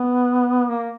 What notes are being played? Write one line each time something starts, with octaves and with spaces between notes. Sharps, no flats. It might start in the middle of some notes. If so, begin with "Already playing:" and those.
Already playing: B3
A#3